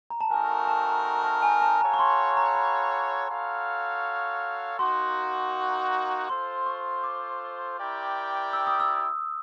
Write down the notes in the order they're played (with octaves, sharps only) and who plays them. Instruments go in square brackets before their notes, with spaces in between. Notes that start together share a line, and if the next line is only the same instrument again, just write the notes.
[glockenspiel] A#5
A5
[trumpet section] A3 C4 D#4 F#4 A#4 [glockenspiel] G#5
[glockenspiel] G#5
A5
A#5
A5
G#5
A5
[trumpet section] F#4 A4 C#5 F5 [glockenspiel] A#5
[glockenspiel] C#6
C6
A#5
B5
[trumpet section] F#4 A4 C#5 F5
[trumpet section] A#3 D#4 F#4 [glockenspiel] C6
[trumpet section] F4 A4 C5 [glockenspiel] C6
[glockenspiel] C#6
D6
[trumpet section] E4 G4 A#4 D5 G5
[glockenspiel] E6
D#6
E6